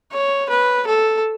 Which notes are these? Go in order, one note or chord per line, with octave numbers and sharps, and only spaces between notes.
C#5
B4
A4